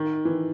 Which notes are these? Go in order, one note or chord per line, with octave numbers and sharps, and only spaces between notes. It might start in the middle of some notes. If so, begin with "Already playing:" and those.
Already playing: D#3
E3